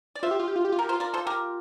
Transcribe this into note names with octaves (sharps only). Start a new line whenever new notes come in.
D5
F4 C5 E5
G4
F4
G4
F4
G4
F4
G4 A#4
F4 C5
F4 A#4 D5
A4 C5
G4 A#4